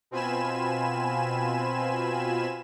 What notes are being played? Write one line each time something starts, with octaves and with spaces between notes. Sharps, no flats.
B2 C4 F4 G#5 B5 E7